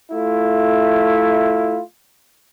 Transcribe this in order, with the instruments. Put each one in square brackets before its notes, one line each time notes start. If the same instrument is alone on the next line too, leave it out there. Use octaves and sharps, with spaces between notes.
[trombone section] A3 E4 F4